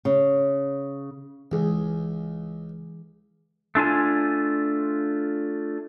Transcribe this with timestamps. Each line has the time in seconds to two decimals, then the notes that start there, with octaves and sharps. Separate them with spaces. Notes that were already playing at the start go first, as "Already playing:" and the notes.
0.05 C#3
1.52 C#2 E3 G#4
3.75 A3 D4 F4 G#5